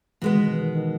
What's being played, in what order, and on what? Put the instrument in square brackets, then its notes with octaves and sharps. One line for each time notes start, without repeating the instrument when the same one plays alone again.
[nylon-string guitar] B2 G#3 B3 [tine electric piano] E3
[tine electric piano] D#3
D#3
D#3
D#3